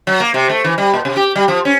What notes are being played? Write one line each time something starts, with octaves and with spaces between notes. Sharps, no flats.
F#3
A#3
C3
A3
E3
G3
A#2
C3
G4
G3
F3
C#4